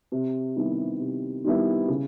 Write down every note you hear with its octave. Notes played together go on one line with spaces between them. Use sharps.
C3
D#3 G3 B3 E4
C3
D#3 G3 B3 E4
C#3